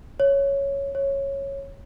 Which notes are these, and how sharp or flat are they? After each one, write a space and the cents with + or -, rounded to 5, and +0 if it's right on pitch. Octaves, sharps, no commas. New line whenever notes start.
C#5 +0
C#5 -10